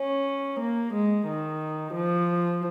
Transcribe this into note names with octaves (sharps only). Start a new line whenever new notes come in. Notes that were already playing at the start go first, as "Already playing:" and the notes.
Already playing: C#4
A#3
G#3
D#3
F3